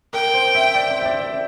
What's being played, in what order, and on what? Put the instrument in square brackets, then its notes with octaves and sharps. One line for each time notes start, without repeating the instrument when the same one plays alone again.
[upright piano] A#4 [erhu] G5
[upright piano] C5
E5
D5
C5
E5
D5
D5